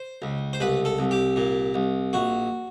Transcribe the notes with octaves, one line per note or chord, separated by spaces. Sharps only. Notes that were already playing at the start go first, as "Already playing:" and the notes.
Already playing: C5
C#2
C5
C2 B4
A4
C2
G4
A#2
C2
A#1 F#4